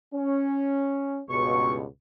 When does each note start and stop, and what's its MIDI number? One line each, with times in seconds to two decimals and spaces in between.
0.14 1.21 61
1.30 1.86 37
1.30 1.86 43
1.30 1.86 47
1.30 1.73 85